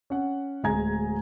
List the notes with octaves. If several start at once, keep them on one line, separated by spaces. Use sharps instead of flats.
C#4 F#5
D1 G#3 G#5 A#5 G#6